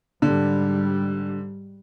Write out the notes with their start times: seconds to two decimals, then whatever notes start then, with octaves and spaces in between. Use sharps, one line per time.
0.22 G#2 D3 G3